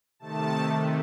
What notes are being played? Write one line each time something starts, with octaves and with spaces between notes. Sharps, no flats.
C3 D#3 A3 A5